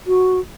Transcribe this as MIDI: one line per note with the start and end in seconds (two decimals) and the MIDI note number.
0.07 0.39 66